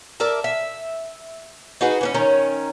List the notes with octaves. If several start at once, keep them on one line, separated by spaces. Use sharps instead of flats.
A#4 D5 E5 A5
E5
D#4 F#4 G#4 B4
E3 B3 C#4
D#3 C#4 C#5